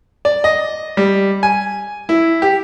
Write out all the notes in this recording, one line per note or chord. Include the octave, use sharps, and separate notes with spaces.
D5
D#5
G3
G#5
E4
G4